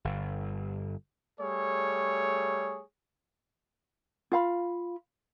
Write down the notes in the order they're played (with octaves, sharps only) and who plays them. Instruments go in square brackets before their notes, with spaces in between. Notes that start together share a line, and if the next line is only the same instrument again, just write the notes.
[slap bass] G1
[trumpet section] G3 A3 G#4 C#5
[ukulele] F4 F5 B5